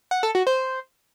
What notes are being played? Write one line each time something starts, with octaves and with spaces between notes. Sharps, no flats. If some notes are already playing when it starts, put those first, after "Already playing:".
F#5
A4
F#4
C5